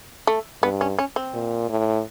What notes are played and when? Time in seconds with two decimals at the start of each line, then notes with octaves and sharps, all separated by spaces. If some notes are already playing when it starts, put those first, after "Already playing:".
0.27 A3
0.62 G2 B3
0.81 C#4
0.99 C#4
1.16 C4
1.34 A#2
1.69 A2